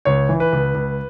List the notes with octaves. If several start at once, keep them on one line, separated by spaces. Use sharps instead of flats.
C#2 C#5
E3
B4
C#2
C#2